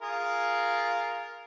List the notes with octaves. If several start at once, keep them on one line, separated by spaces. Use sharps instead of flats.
F4 G#4 A#4